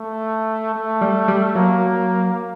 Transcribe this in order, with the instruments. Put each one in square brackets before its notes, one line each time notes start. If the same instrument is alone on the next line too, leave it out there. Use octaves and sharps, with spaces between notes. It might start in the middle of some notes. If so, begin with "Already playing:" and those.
Already playing: [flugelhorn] A3
A3
[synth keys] G3
G3
[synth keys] F#3 [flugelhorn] A#3